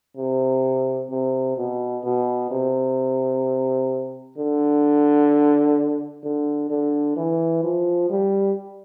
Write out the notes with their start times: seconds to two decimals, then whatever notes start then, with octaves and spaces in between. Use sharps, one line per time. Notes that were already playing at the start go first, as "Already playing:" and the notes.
0.17 C3
1.10 C3
1.57 B2
2.04 B2
2.51 C3
4.37 D3
6.23 D3
6.70 D3
7.17 E3
7.64 F3
8.10 G3